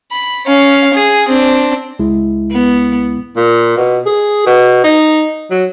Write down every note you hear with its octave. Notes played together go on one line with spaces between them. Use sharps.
B5
C#4 F5
G#4
C4 D4
C#2 G#3 E4
B3
A#2
B2
G#4
B2
D#4
F#3